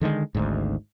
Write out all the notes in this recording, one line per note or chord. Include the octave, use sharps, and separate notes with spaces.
D3 D#3 G3 G#3
G#1 D2 G#2